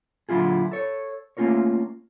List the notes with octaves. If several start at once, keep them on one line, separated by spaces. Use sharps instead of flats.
A#2 D3 F#3 E4 F4 G#4
A4 C#5
A3 A#3 C#4 F4 A#4 C#5